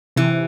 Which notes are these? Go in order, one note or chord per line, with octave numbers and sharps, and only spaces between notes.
C3 E3